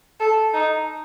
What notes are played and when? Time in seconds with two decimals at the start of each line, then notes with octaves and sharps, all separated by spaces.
0.20 A4
0.54 D#4